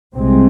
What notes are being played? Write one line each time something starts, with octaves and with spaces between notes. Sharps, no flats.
C2 C3 G#3 C4